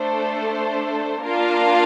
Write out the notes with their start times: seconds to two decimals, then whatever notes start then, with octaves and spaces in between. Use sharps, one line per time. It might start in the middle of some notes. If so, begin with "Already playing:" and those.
Already playing: A3 D4 A4 C5
1.24 A#3 D4 F4 A#4 F5